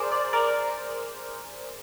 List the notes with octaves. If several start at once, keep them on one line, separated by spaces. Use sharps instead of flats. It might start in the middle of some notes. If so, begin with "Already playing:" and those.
Already playing: G#4 A#4 C5 D5
D5
A#4 D5